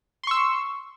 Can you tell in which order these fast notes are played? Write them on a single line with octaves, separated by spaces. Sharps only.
C6 C#6 E6